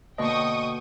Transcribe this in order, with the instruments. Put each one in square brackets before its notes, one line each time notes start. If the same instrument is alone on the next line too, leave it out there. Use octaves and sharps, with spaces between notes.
[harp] B2 D3 A#3 [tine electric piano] D#5 [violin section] G5 C#6 D#6